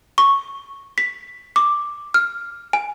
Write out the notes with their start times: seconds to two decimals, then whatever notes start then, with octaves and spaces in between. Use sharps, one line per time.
0.18 C#6
0.98 B6
1.56 D6
2.14 F6
2.73 G#5